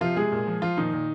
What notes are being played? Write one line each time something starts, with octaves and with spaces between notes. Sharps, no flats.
C3 F3 F4
C3 G#3 G#4
A#2
F3
F3 F4
A#2 D#3 D#4
A#2